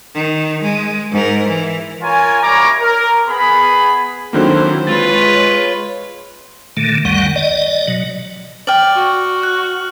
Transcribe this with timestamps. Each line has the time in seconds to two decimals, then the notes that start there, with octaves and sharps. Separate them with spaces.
0.14 D#3
0.62 G#3
1.11 G#2 A#4
1.48 E3
2.02 F4 A#4 C#5 G#5
2.43 G3 E4 A#4 C#5 A#5 D6
2.80 A#4
3.28 B3 G#4 B5
4.33 D3 D#3 F#3 A#3 C4 E4 C5
4.87 G#3 F4 B4 C#5 A6
6.77 A#2 D3 D#3 A3
7.05 C#2 F#2 D#3 G3 F#5
7.36 D5 D#5
7.87 B2 F#3
8.67 D5 G5 F6 F#7
8.95 F#4
9.43 F#6